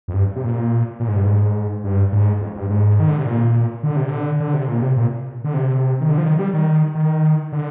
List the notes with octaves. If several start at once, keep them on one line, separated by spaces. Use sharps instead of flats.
F2
G2
C3
A#2
A#2
G#2
G2
G#2
G2
G#2
F2
G2
G#2
D#3
D3
C3
A#2
D3
C3
D3
D3
C3
A#2
C3
A#2
D3
C3
D#3
D3
F3
D#3
G3
D#3
D#3
D3